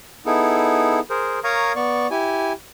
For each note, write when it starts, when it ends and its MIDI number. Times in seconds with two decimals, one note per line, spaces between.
0.26 1.00 59
0.26 1.00 63
0.26 1.00 64
0.26 1.00 68
0.26 1.00 69
1.10 1.39 68
1.10 1.39 70
1.10 1.39 72
1.44 1.72 70
1.44 1.72 73
1.44 1.72 77
1.44 1.72 82
1.44 1.72 85
1.44 1.72 87
1.76 2.07 59
1.76 2.07 74
1.76 2.07 85
2.11 2.53 64
2.11 2.53 67
2.11 2.53 80